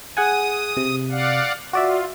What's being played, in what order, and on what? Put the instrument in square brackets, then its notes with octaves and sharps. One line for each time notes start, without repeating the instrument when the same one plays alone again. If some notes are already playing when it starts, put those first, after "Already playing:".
[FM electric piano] G#4 F#5 G#5 [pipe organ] D#6
[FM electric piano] C3
[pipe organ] D5 F5 F#5
[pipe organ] F4 [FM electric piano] F#4 D5 E5